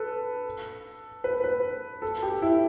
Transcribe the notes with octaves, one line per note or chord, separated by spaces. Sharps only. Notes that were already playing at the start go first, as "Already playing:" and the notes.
Already playing: A4 B4
B4
B4
A4
G4
E4